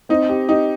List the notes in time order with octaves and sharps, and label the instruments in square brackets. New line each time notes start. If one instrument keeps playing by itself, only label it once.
[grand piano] C4 [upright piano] D#4
[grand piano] G4
[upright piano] D#4 [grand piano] G4